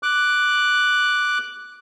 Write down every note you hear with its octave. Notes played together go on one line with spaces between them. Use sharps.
D6 F#6